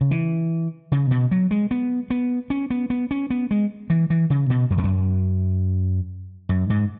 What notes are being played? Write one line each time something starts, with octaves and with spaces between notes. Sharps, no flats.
C#3
E3
C#3
B2
F#3
G#3
B3
B3
C#4
B3
B3
C#4
B3
G#3
E3
E3
C#3
B2
F#2
E2
F#2
F#2
G#2